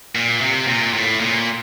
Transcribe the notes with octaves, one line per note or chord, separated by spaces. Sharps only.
A#2
C3
A#2
A2
A#2